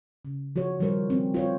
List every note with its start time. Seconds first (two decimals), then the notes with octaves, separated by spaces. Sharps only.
0.25 C#3
0.56 F3 F#4 C#5
0.79 D#3 F3 G3 A#4 C5
1.10 C4
1.34 F4 C5 C#5